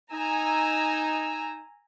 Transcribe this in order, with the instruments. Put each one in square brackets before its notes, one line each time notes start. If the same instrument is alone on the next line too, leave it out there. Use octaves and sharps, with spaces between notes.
[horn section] D#4 [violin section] G#5 A#5 E6